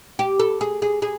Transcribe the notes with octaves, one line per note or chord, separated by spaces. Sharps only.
G4
A4
G#4
G#4
G#4